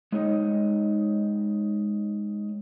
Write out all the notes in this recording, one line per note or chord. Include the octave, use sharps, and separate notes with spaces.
G#3 D#4 G#4 C#5 D#5 G5